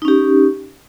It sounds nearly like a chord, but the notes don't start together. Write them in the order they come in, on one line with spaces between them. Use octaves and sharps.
D#4 C#4 G4